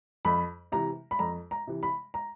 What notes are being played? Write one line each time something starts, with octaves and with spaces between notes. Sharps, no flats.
F2 B5
C3 E3 A#5
B5
F2 A#5
A#5
C3 E3
B5
A#5